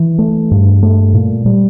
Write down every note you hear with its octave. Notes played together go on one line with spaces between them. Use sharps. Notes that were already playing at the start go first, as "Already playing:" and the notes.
Already playing: E3
A3
G2
A3
A#2
G3